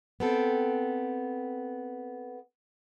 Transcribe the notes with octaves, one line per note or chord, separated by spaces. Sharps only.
B3 C4 A4